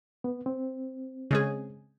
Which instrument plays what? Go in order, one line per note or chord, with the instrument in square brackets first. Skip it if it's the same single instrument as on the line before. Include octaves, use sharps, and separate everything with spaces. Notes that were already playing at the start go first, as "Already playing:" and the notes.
[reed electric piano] B3
C4
[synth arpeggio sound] C#3 G#3 G#4